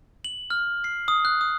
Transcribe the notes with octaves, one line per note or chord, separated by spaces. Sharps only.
F#7
F6
C7
D#6
F#6
D#6